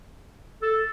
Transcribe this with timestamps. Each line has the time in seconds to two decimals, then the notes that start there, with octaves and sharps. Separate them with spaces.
0.62 A4